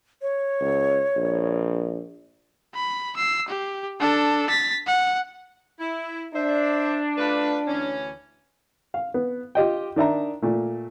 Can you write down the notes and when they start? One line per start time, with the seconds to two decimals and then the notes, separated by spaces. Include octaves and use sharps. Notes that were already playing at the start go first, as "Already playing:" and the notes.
0.22 C#5
0.61 C#2
1.16 A#1
2.75 B5
3.16 E6 C7
3.49 G4
4.00 D4 A4
4.49 A6 B6
4.87 F#5
5.80 E4
6.34 D4 C5 E5
7.18 A3 F4 B4
7.67 D2 E3 C#4
8.94 F5
9.14 B3
9.55 F4 G4 D#5 G5
9.96 D#3 D4 E5 A#5
10.42 A#2 A3